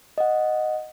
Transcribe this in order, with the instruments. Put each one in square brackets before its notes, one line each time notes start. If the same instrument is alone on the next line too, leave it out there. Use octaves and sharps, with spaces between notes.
[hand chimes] D#5 F#5